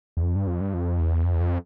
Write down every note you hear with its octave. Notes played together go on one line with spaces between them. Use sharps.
E2
F2
G2
F2
G2
F2
E2
F2
E2
F2